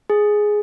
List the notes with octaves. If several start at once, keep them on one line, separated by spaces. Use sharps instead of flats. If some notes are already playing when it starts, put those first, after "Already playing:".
G#4